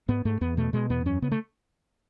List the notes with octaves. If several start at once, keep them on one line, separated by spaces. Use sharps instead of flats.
G#2 B3
G#2 A3
E2 B3
B2 A3
B2 G#3
E2 B3
F#2 C#4
C#3 B3
A3